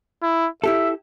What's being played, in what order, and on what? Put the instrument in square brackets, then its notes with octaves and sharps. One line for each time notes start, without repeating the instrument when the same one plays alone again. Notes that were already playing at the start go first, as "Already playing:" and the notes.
[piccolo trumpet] E4
[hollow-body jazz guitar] E4 G4 A4 [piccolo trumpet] E5